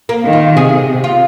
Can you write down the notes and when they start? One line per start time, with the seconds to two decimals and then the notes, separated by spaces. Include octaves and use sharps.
0.09 A#3
0.25 D#3
0.33 F4
0.56 C3 G#4
1.04 F4